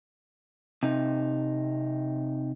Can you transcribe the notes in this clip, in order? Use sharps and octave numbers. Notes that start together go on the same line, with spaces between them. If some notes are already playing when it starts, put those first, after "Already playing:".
C3 D#4